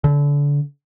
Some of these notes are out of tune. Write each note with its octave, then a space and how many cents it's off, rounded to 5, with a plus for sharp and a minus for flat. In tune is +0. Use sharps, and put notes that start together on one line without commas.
D3 -30